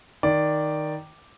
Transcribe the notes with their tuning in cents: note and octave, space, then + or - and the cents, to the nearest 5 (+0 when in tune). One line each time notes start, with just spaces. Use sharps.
D#3 +0 D5 +0